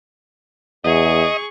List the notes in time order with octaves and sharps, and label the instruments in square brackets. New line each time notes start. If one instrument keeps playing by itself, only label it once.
[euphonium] E2 [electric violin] G#4 C#6 [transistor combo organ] D#5